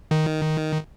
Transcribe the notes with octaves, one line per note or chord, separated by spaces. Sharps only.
D#3